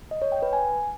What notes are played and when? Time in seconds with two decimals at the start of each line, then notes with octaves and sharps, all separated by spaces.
0.11 D#5
0.22 C#5
0.32 G5
0.42 B4
0.53 G#5